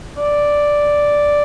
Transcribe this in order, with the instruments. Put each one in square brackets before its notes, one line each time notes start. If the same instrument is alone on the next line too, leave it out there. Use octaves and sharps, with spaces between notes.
[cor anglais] D5